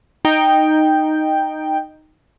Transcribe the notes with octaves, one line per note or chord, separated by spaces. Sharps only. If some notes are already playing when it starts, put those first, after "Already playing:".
D#4 G5